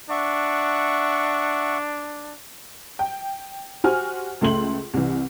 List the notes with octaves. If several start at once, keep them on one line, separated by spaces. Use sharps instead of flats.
D4 E5 F#5 C#6
G5
F#4 G4 C5 G#5 F6
C#2 A3 C6 F#7
C2 E3